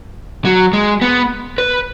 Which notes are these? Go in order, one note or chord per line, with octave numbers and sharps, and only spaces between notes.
F#3
G#3
B3
B4